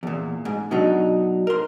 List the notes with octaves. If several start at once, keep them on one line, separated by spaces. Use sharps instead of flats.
E2 A#2
G#2
B2 F#3 D4 D#4
A#4 C6